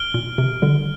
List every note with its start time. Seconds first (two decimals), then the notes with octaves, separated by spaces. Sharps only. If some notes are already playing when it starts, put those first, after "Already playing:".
Already playing: F6 D7 G7
0.14 A#2
0.38 C3
0.62 D3 G3